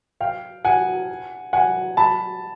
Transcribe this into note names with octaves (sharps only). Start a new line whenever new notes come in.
F5 G5
F#5 G#5
F#5 G#5
A5 B5